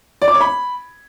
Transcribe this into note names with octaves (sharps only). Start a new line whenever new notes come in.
D5
D6
C#5
B5